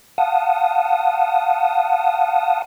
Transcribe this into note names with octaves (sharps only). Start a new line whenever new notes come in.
F5 F#5 A5 D#6